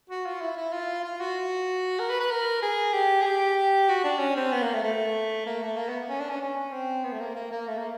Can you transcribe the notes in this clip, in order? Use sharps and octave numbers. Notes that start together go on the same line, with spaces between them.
F#4
F4
E4
E4
F4
F4
F#4
A#4
B4
B4
A#4
G#4
G4
G#4
G4
F#4
D4
C#4
C4
B3
A#3
A3
A3
A#3
A3
A#3
B3
C#4
D4
C#4
C#4
C4
B3
A3
A#3
A#3
A#3
A3
A#3